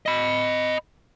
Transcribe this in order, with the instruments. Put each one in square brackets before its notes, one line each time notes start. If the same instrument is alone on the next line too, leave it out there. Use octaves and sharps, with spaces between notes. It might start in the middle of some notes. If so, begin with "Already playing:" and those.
[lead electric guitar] D#5 B5